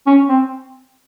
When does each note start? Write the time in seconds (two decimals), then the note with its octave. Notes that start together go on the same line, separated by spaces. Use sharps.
0.07 C#4
0.29 C4